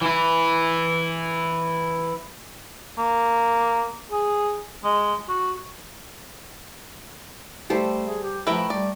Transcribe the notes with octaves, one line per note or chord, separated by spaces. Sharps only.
E3 E4
A#3
G#4
G#3
F#4
G3 A3 A4 C5
G#4
G4
F3 A3 E4 B4 G5 A#5
G3 D5